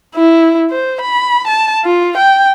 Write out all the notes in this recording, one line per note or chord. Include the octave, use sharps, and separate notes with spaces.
E4
C5
B5
A5
F4
G5